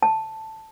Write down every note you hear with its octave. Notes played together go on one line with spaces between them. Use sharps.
A5